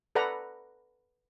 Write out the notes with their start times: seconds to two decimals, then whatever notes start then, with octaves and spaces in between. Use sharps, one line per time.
0.15 A4 B4 D5 F#5 A#5 B5